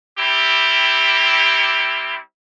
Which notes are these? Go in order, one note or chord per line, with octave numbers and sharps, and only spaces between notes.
G3 C4 E4 G4